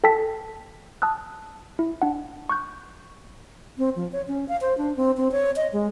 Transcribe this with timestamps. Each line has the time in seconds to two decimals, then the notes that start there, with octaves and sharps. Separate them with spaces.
0.04 A4 G5 A5 E6 B6
1.02 A5 D#6 E6 F#6
1.79 E4
2.02 D4 F#5
2.49 C#6 F#6 G6
3.78 C4
3.96 F3
4.12 C#5
4.28 C#4
4.48 F5
4.61 C5
4.78 D4
4.97 C4
5.17 C4
5.32 C#5
5.56 D#5
5.73 G#3